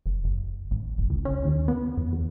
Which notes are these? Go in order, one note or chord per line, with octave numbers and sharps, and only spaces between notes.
F#1
F#1
A1
F#1
C#2
C#4
D#2
B3
F2
E2